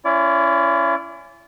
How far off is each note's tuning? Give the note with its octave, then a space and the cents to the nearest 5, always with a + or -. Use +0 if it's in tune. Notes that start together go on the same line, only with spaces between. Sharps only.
C#4 +0 E4 +35 D5 -25